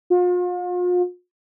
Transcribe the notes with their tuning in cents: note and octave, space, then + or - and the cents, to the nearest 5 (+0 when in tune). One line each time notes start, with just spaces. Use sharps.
F4 +40